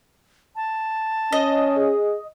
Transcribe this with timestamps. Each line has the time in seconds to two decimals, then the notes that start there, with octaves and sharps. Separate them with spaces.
0.56 A5
1.33 C#4 D#5
1.77 G#4